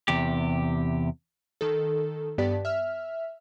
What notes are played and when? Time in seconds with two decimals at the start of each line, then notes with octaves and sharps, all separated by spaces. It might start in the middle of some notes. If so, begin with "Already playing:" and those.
0.08 E2 C3 G4
1.61 D#3 A4
2.38 G2 B3 G4 D5 A5 B6
2.65 E5 F6